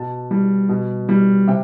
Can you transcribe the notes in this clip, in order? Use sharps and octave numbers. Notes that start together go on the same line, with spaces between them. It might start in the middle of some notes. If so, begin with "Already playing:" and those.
Already playing: B2 A5
G3
B2
G3
C3 G5